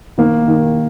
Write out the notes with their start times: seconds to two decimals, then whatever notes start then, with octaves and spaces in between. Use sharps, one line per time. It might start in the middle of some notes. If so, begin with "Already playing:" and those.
0.18 D#3 A#3
0.48 D#3